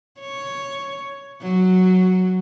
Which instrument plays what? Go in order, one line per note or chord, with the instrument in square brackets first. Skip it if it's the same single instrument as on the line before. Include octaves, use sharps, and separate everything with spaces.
[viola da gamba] C#5
F#3